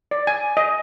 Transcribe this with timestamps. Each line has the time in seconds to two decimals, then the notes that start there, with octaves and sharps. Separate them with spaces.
0.11 D5
0.27 G#5
0.57 D#5